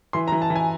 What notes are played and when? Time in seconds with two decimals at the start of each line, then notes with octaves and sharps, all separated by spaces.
0.13 E3 C6
0.28 A#5
0.32 E3
0.42 A5
0.50 E3
0.56 G#5